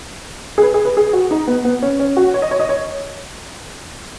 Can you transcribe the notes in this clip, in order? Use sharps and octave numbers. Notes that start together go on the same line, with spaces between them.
G#4
B4
G#4
B4
G#4
F#4
D#4
B3
B3
C#4
C#4
F#4
C#5
D#5
C#5
D#5
C#5